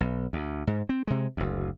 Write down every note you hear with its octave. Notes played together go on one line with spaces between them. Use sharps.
B1
D2
G#2
C4
C3 G#3
F#1 D2